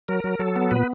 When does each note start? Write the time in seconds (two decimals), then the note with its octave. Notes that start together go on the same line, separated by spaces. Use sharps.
0.08 F#3 A#4
0.24 F#3
0.39 F#3 A4
0.56 B3
0.71 A#2 B4